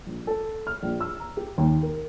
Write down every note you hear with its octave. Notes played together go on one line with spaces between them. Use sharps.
A#1
A4
F6
A#1
E6
A#5
G4
D#2
A#4